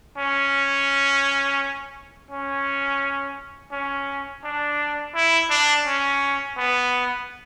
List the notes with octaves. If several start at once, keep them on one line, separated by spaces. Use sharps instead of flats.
C#4
C#4
C#4
D4
E4
D4
C#4
B3